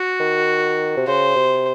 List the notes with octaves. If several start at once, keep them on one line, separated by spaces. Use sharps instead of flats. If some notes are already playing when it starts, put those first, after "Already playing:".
Already playing: F#4
D#3
C3
C#3 C5
C3